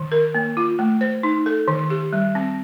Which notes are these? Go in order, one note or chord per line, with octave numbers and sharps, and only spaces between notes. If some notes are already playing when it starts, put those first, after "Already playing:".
Already playing: D#3
A#4
A#3
F4
A3
C5
D#4
A4
D#3
G4
G3
C4